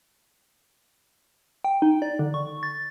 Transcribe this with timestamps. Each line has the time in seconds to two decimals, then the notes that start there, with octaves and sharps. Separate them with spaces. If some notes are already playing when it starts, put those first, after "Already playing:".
1.64 G5
1.82 D#4
2.02 D5
2.19 D3
2.34 C#6
2.63 A6